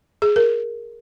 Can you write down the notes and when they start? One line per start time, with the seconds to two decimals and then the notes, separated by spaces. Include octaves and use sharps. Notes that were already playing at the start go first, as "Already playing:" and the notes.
0.22 G#4
0.36 A#4